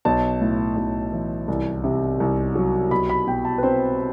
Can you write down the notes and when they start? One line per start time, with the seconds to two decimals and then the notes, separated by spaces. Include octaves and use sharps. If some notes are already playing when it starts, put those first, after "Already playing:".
0.05 B1 A5
0.41 A2
0.77 B1
1.12 E3
1.48 C2
1.84 C3
2.20 C2
2.55 F#3
2.91 B1 B5
3.09 B5
3.27 B2 G5
3.45 A5
3.58 B4
3.63 C4 C5